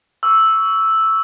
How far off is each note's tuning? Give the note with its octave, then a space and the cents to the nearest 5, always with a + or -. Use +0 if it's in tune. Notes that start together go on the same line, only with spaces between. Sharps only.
C#6 +25 E6 -5